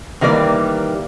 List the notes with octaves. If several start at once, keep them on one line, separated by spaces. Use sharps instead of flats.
D#3 E3 G3 A#3 D5